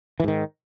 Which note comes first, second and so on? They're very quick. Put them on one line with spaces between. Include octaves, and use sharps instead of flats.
E3 G#2 D#3